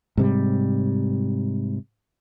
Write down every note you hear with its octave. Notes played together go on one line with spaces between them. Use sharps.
G#2 C3 G3